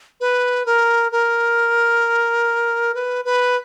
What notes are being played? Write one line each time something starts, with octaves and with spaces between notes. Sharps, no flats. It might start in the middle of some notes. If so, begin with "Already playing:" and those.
B4
A#4
A#4
B4
B4